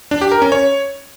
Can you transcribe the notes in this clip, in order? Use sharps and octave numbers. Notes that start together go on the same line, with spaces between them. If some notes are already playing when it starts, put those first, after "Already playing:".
D4
G4
A#4
C#4
C#5